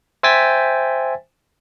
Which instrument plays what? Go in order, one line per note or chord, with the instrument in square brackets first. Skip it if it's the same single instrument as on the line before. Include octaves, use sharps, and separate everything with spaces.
[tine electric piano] C5 E5 G5 G#5 A6 B6